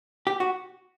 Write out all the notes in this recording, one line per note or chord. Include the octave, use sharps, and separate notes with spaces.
G4
F#4